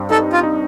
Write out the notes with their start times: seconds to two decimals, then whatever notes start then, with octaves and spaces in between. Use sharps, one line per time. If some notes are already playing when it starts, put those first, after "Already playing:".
Already playing: G2 C4
0.10 D#4 A4
0.33 F4
0.43 D#4